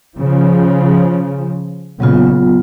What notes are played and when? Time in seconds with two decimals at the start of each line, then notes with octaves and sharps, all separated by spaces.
0.18 C#3 F3
2.00 A#2 C#3 F#3 B3 F4